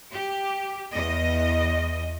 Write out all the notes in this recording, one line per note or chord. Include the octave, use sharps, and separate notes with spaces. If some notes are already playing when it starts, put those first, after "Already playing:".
G4
E2 D#5